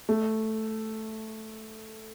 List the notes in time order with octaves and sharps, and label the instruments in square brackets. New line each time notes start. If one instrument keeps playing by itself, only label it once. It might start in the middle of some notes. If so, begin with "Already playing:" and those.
[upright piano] A3